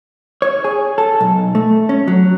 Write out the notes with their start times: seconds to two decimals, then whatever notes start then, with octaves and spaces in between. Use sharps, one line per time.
0.42 C#5
0.64 G#4
0.98 A4
1.21 B1
1.55 A3
1.89 C#4
2.08 F#3